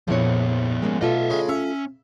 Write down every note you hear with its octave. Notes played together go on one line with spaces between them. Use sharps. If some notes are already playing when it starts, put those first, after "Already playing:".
A#1 F2 F3 B3 E4 C#5
G#3 A#3 C#4
B1 A3 F4 A4 D#5 E5
C#3 G#3
C#4 E5